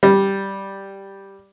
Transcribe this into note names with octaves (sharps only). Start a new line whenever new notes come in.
G3